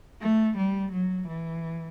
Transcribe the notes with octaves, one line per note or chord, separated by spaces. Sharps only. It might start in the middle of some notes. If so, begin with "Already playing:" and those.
A3
G3
F#3
E3